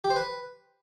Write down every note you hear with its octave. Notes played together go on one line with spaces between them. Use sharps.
G4
C5
B4